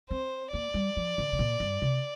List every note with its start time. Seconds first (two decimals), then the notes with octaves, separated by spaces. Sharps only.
0.11 C4 C5
0.53 A#3 D5
0.74 G3
0.97 F3
1.18 D3
1.33 C3
1.39 A#2
1.60 G2
1.82 C3